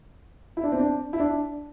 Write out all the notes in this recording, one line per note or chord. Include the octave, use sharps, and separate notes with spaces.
E4
D4
C4
D4
E4
D4